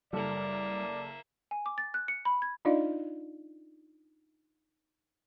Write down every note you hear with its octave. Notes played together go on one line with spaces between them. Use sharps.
F#1 G3 A#3 A4 D5 E5
G#5
D6
A6
F#6
C#7
B5
G#6
D4 D#4 F4 D5 D#5 F5